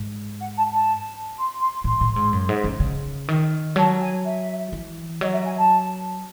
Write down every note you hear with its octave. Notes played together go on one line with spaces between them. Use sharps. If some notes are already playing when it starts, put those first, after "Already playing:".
Already playing: G#2
F#5
A5
A5
C6
C6
A2 C6
A2
G#2
F#2
G#2
C#3
C#3
D#3
F#3 A5
G#5
E5
E3
F#3 D#5
E5
G#5
A5